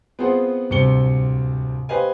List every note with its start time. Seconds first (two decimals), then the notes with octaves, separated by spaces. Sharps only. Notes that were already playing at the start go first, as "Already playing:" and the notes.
0.19 B3 C4 F4 G#4 C5 F#5
0.70 D1 C2 C3 C4 C#7 G7
1.89 G4 B4 C5 D#5 F5 G#5